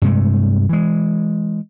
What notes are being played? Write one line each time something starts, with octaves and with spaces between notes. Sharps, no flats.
G2 C3 G#3 A3
E3 G#3